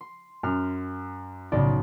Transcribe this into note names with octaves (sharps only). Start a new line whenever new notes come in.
C6
F#2 F6
B1 A2 C#3 D5